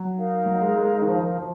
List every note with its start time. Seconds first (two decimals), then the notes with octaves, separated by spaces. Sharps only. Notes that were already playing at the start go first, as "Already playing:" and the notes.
Already playing: F#3
0.15 D#4 A#4 F5
0.46 F#3
0.61 G#3
0.77 G#3
0.93 G#3
1.02 D#3
1.07 F3
1.23 F3
1.38 F3 F#4